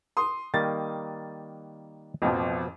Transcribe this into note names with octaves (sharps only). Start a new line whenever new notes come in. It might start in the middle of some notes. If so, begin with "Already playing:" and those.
C6 D#6
D#3 G3 A#3 A6
A1 F2 B2 F3